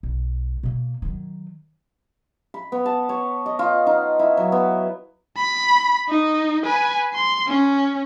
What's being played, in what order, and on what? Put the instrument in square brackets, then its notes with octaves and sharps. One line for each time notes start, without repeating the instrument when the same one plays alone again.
[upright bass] B1
B2 A#3
D#3 F#3
[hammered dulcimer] B5
B3
A5
C#5
D#5
F4
D#4
E4
F#3
B3
[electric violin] B5
D#4
B4 G#5
C6
C#4